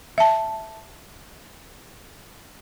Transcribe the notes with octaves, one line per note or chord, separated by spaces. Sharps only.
E5 A5